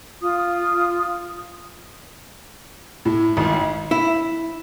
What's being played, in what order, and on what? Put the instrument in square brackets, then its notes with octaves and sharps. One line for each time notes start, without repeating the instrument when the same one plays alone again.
[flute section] F4 D#6
[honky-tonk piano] A2
G#1
[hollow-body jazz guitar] E4